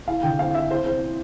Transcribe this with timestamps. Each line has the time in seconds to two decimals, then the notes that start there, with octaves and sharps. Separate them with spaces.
0.07 E4 F5
0.23 D3 G5
0.39 C4 F5
0.55 C4 E5
0.71 E4 C5
0.86 C4 C5
1.02 C4